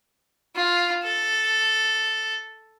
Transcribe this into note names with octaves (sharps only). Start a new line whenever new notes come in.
F4
A4